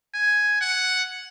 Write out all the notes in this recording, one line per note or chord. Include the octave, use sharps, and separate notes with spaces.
G#5
F#5